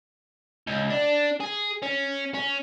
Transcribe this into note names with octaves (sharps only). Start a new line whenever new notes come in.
C#2
D4
G#4
C#4
C#4